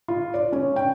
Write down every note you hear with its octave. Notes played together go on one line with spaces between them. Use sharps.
F4
D5
C#4
G5